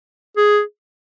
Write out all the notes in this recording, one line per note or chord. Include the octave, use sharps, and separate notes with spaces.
G#4